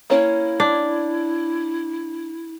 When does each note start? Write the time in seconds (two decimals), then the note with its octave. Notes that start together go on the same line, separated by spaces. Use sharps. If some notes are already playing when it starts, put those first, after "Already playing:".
0.10 A#3 C#4 E4 C#5
0.60 D4